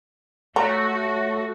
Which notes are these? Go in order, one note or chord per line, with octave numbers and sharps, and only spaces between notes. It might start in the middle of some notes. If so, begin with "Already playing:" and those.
A3 F#4 C#5 A#5